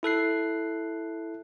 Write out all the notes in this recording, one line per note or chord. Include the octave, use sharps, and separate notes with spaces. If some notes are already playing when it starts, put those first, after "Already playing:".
E4 A4 F#6 C7